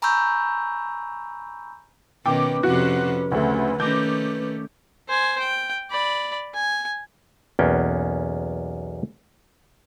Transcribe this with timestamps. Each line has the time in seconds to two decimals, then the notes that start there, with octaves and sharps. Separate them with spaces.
0.02 G#5 A#5 B5 C#6 E6 G6
2.26 B2 D#3 C#4 B4 G5 D6
2.63 F2 C3 C#4 F#4
3.32 D2 C#3 A3
3.80 D#3 A3 C#4 D6 G6
5.09 C5 G#5
5.40 G5
5.91 D5 B5
6.55 G#5
7.59 B1 E2 A#3 B3 C#4 G5